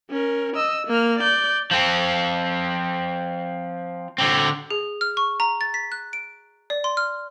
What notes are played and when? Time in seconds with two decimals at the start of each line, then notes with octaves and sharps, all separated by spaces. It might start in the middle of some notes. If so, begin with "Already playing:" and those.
0.10 C#4 A#4
0.56 D#5 E6
0.87 A#3 F6
1.19 D5 G6
1.71 F3 C4
4.18 D3 C4
4.71 G#4
5.01 F6
5.17 C#6
5.40 A#5
5.61 A6
5.74 B6
5.92 F#6
6.13 D7
6.70 D5
6.84 C6
6.97 F6